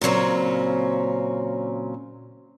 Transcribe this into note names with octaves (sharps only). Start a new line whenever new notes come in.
A#2 C#3 F#3 C4 C#4